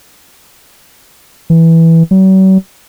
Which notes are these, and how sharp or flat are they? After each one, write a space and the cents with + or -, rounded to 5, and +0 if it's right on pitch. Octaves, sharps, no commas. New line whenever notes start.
E3 -5
F#3 +45